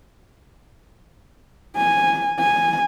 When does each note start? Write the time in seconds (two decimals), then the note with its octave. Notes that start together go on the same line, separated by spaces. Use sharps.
1.77 G#5
2.39 G#5